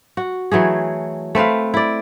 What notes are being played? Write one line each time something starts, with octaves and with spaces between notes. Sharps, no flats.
F#4
E3 F#3 A3 G#4
A3 C4 B4 F5
E4 D5